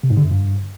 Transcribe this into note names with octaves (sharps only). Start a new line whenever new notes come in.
C3
G#2
D3
F#2
G2